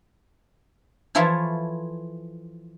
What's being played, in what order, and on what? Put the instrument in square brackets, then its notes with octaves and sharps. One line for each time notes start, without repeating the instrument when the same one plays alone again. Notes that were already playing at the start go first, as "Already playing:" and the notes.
[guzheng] E3 F3 E4 F4 A4 C#5